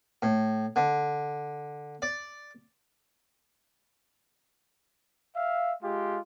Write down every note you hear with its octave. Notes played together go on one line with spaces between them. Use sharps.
A2
D3
D5
E5 F5
G#3 F4 G4